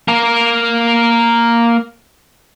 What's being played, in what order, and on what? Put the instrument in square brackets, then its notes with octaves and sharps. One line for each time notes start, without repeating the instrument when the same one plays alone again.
[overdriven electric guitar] A#3 A#4